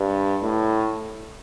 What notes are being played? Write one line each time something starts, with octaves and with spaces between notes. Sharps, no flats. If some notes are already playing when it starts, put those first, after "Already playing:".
Already playing: G2
A2